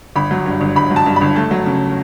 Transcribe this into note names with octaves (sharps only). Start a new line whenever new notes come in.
G1 B5
F#3
G2
G1
G1 B5
F#3
A5
G2
B5
G1
A3 A5
F#3
C#3